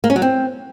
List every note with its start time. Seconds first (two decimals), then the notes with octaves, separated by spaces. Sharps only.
0.04 A#3
0.10 C#4
0.16 F#3
0.22 C4